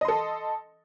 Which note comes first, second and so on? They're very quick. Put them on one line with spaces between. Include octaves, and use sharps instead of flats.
D#5 C6 A4